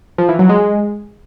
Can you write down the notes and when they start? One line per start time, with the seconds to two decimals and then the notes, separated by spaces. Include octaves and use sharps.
0.18 F3
0.29 E3
0.39 F#3
0.49 G#3